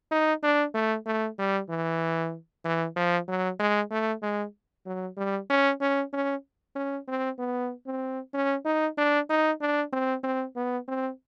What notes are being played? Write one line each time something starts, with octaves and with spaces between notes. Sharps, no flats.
D#4
D4
A3
A3
G3
E3
E3
F3
F#3
G#3
A3
G#3
F#3
G3
C#4
C#4
C#4
C#4
C4
B3
C4
C#4
D#4
D4
D#4
D4
C4
C4
B3
C4